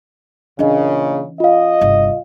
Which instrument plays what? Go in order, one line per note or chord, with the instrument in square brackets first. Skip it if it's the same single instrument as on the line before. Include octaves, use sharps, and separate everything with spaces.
[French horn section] A#2 C#3 [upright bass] E3 C#4 [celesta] D4 D#5
[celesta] F4 F5 [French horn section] D#5
[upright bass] G1 C2